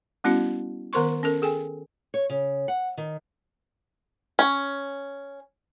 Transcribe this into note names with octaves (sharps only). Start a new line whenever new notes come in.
G3 B3 C#4 E4 F#4
D#3 B3 A#4 C5 C6 C#6
C#4 A4 A#4
G#4 A4 G5 G#5
C#5
C#3
F#5
D#3
C#4